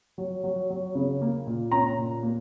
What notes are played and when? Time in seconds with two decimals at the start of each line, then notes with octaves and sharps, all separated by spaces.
0.18 F#3
0.44 F#3
0.70 F#3
0.95 C#3
1.21 A#3
1.47 A#2
1.72 C#4 A#5
1.98 A#2
2.23 A#3